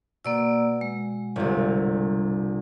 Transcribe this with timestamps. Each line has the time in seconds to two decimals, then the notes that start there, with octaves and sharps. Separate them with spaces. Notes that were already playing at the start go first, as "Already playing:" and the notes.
0.25 B2 A#3 D5 E6
0.81 G#3
1.36 G1 C2